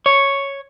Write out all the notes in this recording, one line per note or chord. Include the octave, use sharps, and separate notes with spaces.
C#5